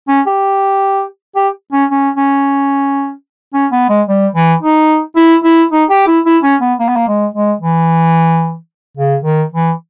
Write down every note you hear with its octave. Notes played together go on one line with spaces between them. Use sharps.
C#4
G4
G4
C#4
C#4
C#4
C#4
B3
G#3
G3
E3
D#4
E4
E4
D#4
G4
E4
E4
C#4
B3
A#3
B3
A#3
G#3
G#3
E3
C#3
D#3
E3